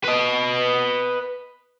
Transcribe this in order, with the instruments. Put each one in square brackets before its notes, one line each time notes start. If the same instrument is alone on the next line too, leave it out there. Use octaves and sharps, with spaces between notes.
[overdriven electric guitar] B4 D#5